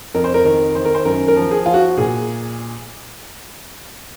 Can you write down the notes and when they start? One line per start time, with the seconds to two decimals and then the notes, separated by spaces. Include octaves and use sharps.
0.14 F2 A#4
0.24 C5
0.34 A#4
0.45 D#3 A#4
0.75 D#3 C5
0.85 A#4
0.95 C5
1.05 F#2 A#4
1.28 A#4
1.36 F3
1.51 G#4
1.66 F3 F4
1.74 F#4
1.97 A#2 G#4